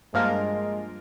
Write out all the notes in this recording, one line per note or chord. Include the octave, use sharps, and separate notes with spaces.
G2 F3 G#3 A#3 F4 A#4